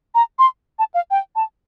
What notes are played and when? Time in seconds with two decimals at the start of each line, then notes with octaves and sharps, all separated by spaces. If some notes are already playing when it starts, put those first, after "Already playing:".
0.15 A#5
0.39 C6
0.79 A5
0.94 F5
1.11 G5
1.36 A5